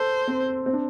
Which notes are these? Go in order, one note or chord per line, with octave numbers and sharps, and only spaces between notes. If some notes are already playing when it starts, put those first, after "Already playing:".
Already playing: A4 C5
C4
C4
D4